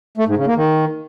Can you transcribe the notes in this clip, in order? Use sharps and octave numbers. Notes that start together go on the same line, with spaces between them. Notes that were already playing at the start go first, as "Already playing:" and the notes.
A3
G#2
C#3
A#3
D#3